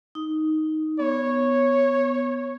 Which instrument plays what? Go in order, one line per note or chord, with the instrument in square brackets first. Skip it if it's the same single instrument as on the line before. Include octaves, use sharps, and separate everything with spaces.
[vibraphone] D#4
[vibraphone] B3 [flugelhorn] C#5